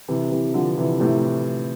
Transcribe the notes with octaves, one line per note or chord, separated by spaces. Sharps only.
C3 E3
C3 E3
D3 F3
C3 E3
A2 C3